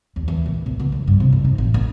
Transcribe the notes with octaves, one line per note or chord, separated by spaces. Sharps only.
D#2
E3
A#1
A#1
C#2
D#2
G2
C3
G2
D#4
A1
A#1